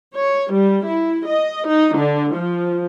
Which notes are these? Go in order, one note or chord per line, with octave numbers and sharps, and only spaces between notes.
C#5
G3
E4
D#5
D#4
D3
F3